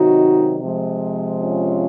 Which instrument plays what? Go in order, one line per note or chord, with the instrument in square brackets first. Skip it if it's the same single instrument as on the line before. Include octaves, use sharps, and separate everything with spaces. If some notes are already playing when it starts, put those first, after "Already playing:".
Already playing: [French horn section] C3 D#3 F#3 D#4 F#4
C3 F3 G#3
C#4 F4